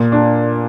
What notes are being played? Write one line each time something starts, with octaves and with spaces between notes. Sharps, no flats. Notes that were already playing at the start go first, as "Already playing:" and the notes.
Already playing: A#2
D4